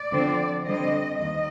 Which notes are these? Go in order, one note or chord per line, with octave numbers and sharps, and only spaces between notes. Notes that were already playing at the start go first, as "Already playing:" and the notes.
Already playing: D5
D3 F3 C4
D3 G3 C4 D#5
D#2 D#5